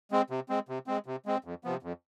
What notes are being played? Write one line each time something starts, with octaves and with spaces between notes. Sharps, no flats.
G#3 C4
C3
G#3 C4
C3
G#3 C4
C3
G#3 C4
F2
C3 F3 B3
F2